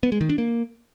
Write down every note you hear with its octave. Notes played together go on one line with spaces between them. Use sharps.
B3
G#3
D#3
D4
A#3